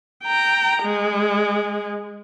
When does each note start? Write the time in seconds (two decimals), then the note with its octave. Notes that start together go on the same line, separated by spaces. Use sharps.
0.24 G5 A#5
0.83 G#3